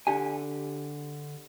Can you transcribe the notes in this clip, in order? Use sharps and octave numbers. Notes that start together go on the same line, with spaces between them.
D3 G4 G#5